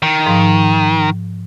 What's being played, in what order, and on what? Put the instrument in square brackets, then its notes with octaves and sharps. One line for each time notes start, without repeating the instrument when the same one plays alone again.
[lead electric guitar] D#3
[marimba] G#2 F3